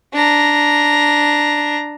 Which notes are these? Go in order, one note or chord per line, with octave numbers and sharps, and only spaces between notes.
D4 A#5